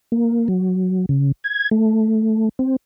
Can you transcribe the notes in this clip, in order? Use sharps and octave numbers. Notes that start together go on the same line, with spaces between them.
A#3
F#3
C#3
G#6
A3
C4